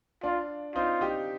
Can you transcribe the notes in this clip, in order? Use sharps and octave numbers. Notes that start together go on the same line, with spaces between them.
D4 F4
C4 D#4 F4
D#4 G4